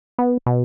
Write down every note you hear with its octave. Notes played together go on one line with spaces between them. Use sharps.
B3
B2